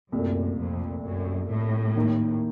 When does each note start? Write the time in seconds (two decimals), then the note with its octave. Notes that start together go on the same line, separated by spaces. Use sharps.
0.12 C2 F#2 A#2 A3
0.59 F2
1.04 F#2
1.50 A2
1.96 D#2 D#3 A#3